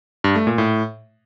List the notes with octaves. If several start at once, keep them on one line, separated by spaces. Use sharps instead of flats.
G2
A3
A#2
A2